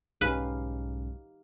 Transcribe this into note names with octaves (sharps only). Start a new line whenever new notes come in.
B1 G#2 C#4 D#4 G4 B4 F5